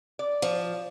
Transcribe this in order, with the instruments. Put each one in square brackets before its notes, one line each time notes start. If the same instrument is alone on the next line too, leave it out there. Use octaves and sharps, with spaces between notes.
[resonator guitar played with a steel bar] D5
[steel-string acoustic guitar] F3